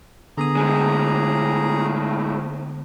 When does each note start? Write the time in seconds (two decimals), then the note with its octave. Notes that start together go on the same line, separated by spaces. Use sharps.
0.38 D3 B3 G#4 A#5 D#6
0.57 A2 G#3